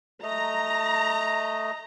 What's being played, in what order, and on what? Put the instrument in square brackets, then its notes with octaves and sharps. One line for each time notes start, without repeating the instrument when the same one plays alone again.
[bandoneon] A3 D#5 [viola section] A#5